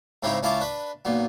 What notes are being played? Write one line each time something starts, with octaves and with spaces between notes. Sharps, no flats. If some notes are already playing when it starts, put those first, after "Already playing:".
G#2 C#3 C4 D#4 E4 G4
C#2 C#4 E4 F4 A5 D6
D4 B4
B1 A#2 B3